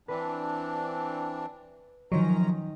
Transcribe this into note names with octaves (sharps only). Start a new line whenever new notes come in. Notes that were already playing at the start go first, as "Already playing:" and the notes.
E3 C4 D4 B4
F#2 D#3 F3 F#3 C#4 D#5 A#5